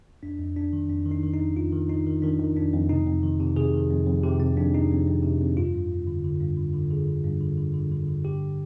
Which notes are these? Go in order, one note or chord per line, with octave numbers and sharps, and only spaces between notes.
F2 D4
F2
F2 D4
D#3
F2 D4
D#3
D#4
D#3
D#4
F2
F2 F4
D#3
D#3 D#4
D#3
D#3 D4
D#3
F2 D4
F2
C3 D#4
F2
D#3
C3
C3 G#4
D#3
F2
F2
C3 G4
C3 C4
F2 D4
F2 D#4
F2
F2
C3
F2
G2 F4
G2
G2
D3
D3
G2
D3
D3
D3 G#4
D3
G2
D3
D3
D3
D3
D3
G2 G4